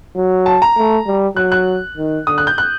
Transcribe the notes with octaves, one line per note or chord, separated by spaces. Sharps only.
F#3
A5
A#5
A3
G3
F#3 F#6
F#6
D#3
D3 D#6
F#6
G6
F#6